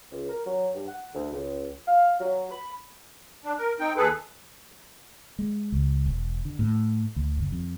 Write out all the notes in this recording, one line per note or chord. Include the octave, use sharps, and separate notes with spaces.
C#2
A#4
F#3
G2
F#5
D2
C#2
F5
F#3
B5
D4
A#4
C4 D#4 G5
D#2 G#4 A4 B4
G#3
C#2
E1
D3
A2
D2
F#1
F2